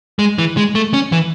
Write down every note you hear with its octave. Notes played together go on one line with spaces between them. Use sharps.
G#3
E3
G#3
A3
C#4
E3